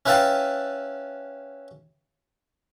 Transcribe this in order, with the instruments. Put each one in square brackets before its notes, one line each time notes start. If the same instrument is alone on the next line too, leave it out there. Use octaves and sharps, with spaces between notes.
[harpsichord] C#4 E4 B4 F5 G5 A5